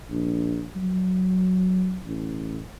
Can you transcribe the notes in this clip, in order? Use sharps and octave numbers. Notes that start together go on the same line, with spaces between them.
A#1
F#3
A1